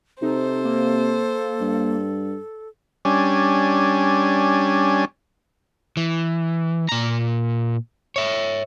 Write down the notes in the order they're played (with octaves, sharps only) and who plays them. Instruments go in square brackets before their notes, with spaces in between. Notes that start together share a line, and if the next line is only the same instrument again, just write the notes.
[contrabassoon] C3 [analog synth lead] D#4 [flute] A4 [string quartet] C5
[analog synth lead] A#3
[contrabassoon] G2
[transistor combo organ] G3 C#4 D4 G#5
[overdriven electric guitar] E3
A#2 A#5
C#5 E5